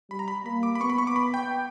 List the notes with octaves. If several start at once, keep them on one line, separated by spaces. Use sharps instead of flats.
G3 B5
A#5
B5
A#3 B5
D6
B5
B3 C#6
B5
C#6
D6
B5
G5